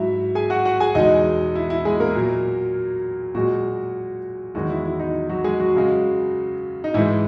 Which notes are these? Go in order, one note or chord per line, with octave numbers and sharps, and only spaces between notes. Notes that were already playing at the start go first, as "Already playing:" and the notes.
Already playing: G#2 F#3 E4 E5
G#4 G#5
F#4 F#5
F#4 F#5
G#4 G#5
E2 B2 G#3 D#4 D#5
E4
E4
G#3 G#4
A#3 A#4
A#2 F#3
A#2 F#3 G#3 F#4
E2 D#3 F#3 G#3 F#4
E4
E4
D#4
F#3 F#4
G#3 G#4
F#3 F#4
F#2 C#3 G#3
D#4
G#2 E3 G#3 E4